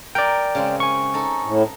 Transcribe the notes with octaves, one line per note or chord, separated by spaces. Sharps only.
A#4 D5 G5 G#5
C#3 G#3 C4
G#5 C#6
D#4 A4
A2